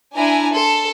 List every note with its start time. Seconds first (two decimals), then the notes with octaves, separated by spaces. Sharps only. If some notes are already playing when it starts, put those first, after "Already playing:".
0.14 D4 E4 G#5 A#5
0.53 A4 C6